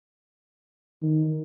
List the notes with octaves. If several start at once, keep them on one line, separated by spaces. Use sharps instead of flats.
D#3